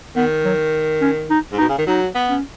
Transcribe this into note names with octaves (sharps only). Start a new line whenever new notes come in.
D#3 B3
F#3
C#4
D#4
G#2
B2 D#4
C#3
D#3
F#3 D#4
B3
C#4